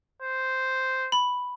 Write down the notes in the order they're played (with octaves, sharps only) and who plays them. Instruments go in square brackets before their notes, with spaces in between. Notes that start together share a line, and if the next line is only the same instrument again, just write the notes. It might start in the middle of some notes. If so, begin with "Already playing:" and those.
[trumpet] C5
[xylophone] B5